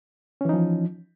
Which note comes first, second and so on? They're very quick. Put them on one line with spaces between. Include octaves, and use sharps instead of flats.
C#4 E3 D#4 F3